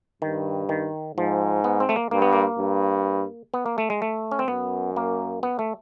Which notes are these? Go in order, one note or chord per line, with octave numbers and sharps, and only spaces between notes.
G2 D#3
D#3
G#2 F3
B3
C4
A3
A#3
G2 A#3
B3
A#3
G2
B3
A#3
A3
G#3
A3
C#4
C4
F#2 B3
A#3
B3
A3